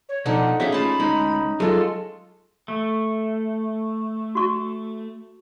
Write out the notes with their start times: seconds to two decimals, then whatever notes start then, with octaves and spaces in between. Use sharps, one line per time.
0.09 C#5
0.26 B2 F3 D4 D#4 A4 F#5
0.60 C#4 F#4 G#4 E5 F5
0.72 A3 C#4 F4 A5 B5
1.00 D2 G#3 D#4
1.60 F#3 G#3 F4 A4
2.68 A3
4.35 F#4 C#6